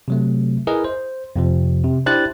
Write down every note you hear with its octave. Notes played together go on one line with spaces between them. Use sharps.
C3 F#3 A3
E4 G#4 A#4 B4 D#5
C5
F2 C3 F3
C3
D4 E4 G4 C5 F#6 A6